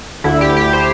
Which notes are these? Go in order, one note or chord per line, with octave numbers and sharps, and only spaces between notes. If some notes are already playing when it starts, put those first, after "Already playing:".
D2 D3 E4
G4
G4
C5